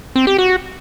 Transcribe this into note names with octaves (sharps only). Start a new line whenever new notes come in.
C4
G4
F#4